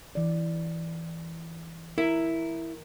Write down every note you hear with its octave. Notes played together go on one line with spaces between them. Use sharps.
E3 D5
E4 A#4